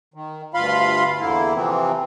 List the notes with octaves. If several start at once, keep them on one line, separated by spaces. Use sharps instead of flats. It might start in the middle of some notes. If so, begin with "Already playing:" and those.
D#3
D2 G2 F4 F5 B5 C6
E2 D3 A#3 E4
C3 E3 F3 C4